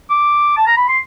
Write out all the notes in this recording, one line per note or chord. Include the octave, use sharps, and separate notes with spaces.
D6
A5
A#5
B5
C6